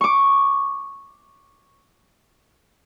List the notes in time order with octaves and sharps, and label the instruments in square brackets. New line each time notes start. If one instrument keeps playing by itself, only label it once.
[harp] C#6 D6